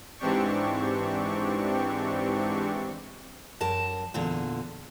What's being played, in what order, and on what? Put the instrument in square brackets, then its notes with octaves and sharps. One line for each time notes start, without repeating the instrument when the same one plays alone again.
[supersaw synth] G#2 E3 C4 D4 G4 C#6
[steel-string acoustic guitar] F#2 A#4 A5
E2 A#2 D3